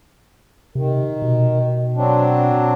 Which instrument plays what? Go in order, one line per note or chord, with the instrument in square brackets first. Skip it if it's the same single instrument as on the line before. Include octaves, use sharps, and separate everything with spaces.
[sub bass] C3 [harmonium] D#3
[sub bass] B2
[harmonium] F#3 C4 D4